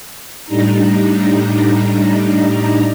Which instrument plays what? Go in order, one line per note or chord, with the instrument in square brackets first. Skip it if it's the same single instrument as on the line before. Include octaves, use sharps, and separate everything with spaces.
[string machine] A2 G3 D4 D#4 A#5